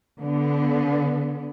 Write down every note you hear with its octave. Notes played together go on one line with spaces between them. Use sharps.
D3 B3